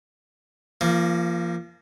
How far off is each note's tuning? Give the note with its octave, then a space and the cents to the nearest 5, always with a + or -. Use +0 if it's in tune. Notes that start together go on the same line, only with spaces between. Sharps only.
F3 -30 A#3 +0